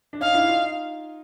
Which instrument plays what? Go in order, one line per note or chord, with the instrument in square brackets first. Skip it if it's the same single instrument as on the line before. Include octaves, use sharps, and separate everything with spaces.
[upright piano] D4
[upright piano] C#4 D#4 [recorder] F5
[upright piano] D4 E4
D#4 F4